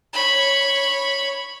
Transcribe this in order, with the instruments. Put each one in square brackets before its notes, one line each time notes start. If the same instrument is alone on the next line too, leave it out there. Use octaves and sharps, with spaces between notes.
[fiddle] C#5 B5